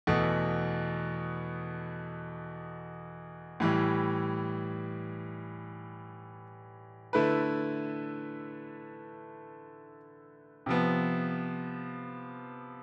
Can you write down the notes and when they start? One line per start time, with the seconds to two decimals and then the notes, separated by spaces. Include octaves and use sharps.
0.07 E2 B2 A3
3.60 A2 E3 G3
7.13 D3 A3 E4 B4
10.66 C3 F3 B3